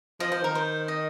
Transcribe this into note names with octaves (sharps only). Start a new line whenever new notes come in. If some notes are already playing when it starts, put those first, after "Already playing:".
F3 D#5
F3 C5
D#3 A#4
C5
D#5